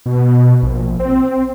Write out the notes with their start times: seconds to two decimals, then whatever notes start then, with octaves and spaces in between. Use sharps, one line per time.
0.06 B2
0.62 A#1
1.00 C4